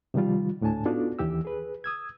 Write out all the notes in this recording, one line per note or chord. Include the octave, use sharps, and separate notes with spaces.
C3 D#3 F3 G3 F4
D2 A2 D4 G#5 A5
B3 D4 D#4 F4 F#4 A4
D#2 E3 G4 E6
G#4 B4
D#6 E6 G#6